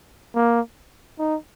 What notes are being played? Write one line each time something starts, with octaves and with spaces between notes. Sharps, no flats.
A#3
D#4